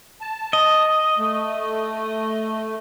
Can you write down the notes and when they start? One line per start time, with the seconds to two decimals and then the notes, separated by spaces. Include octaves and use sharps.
0.21 A5
0.53 D#5
1.18 A3